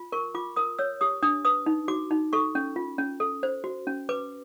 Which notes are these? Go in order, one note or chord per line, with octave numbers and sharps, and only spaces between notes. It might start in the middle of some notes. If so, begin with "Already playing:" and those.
Already playing: F4
A#4 C#6
F4 D6
A#4 D#6
C#5 E6
G4 D#6
D4 D#6
B4 D#6
D#4
F#4 D6
D#4
A4 C#6
C#4
F4
C#4
A4
C5
F#4
C#4
B4 D6